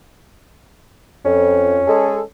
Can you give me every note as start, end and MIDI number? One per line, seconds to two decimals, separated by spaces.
1.25 1.80 41
1.25 2.22 61
1.88 2.20 56
1.88 2.20 68
1.88 2.20 69